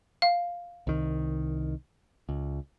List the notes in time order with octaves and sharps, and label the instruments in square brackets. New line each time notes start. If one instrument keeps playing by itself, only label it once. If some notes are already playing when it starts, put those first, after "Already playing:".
[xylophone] F5
[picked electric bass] C2 D#3
C#2